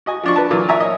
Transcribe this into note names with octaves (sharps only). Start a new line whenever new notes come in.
F#4 D#5 G#5
F3 D4 C#6
B4 A5
A#2 E3 F#3 D6
D5 E5 G#5 A#5 C#6
C#5 D#5